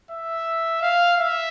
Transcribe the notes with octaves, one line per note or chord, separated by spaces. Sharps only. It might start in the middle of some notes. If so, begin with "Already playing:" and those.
E5
F5
E5